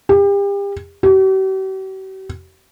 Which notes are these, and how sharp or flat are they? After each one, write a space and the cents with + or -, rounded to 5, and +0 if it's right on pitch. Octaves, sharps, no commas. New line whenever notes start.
G4 +35
G4 -45